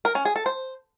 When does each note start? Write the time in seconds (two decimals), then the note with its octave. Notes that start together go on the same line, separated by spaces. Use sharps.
0.05 A#4
0.15 C#4
0.25 G#4
0.36 A4
0.46 C5